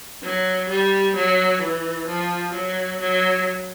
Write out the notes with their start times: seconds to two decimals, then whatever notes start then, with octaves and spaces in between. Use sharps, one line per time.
0.23 F#3
0.69 G3
1.16 F#3
1.62 E3
2.07 F3
2.54 F#3
3.00 F#3